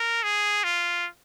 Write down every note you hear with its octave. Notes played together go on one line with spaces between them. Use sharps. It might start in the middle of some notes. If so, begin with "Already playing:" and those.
Already playing: A#4
G#4
F4